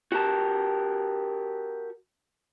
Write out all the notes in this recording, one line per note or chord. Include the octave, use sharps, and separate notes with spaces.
F#4 G4 A#4 A5